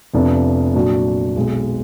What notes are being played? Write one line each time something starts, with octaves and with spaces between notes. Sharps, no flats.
F1 F2 F3 B3 D4
A#2 F#3 D4 F#4
B1 B2 G#3